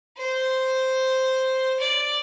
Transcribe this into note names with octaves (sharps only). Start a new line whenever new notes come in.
C5
D5